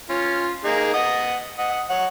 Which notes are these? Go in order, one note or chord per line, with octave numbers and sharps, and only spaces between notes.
C#4 F4
A#3 D#4 G#4
D#5 F#5 D#6
D#5 F#5 D#6
C#5 F#5